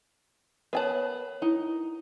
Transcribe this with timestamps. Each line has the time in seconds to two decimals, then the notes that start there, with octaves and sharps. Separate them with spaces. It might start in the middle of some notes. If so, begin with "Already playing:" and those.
0.73 B3 A#4 C#5 G#5 A5
1.42 D#4 E4